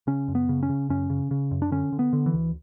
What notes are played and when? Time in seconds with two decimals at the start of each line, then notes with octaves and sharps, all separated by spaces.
0.07 C#3 C#4
0.28 F#2
0.35 B3
0.49 C#3
0.63 C#4
0.69 C#3
0.89 F#2 C#4
1.10 C#3
1.31 C#3
1.51 F#2
1.62 D4
1.71 D3 C#4
1.92 D3
1.99 B3
2.13 D3
2.26 E3
2.33 D2